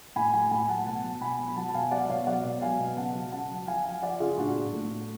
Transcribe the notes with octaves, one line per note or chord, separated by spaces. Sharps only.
A2 G#5 B5
F#3 G#5 B5
A2 G#5 B5
F#3 F#5 A5
B2 F#5 A5
F#3
B2 G#5 B5
F#3
B5
F#3 F#5 A5
A5
B2 F5 G#5
F#3 D5 F#5
B2 C#5 F5
F#3 D5 F#5
B2
F#3 F5 G#5
B2
C#3 F#5 A5
F#3
C#3 F#5 A5
F#3
F3 F5 G#5
F3 F5 G#5
F3 D5 F#5
C#3 F4 G#4
A2 D4 F#4
A2
A2
A2